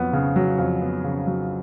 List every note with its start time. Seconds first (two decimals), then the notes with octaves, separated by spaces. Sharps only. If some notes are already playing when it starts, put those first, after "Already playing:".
Already playing: F2 F#3 B3
0.13 C#3
0.36 F#3
0.58 F2
0.81 B3
1.04 C#3
1.27 F#3